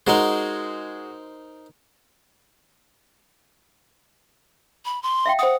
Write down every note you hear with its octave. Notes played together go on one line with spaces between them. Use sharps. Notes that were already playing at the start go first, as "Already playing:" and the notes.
G#3 D#4 F#4 A#4 C5
B5
C6
E5 F5 G5
C5 F#5 D#6